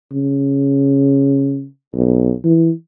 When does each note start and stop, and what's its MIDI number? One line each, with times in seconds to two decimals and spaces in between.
0.12 1.65 49
1.94 2.33 35
2.44 2.70 52